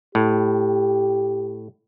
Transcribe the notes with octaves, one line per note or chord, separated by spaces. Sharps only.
A2 G4